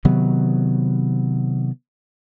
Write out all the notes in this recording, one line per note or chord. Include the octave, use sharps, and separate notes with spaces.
C3 D#3 F#3 B3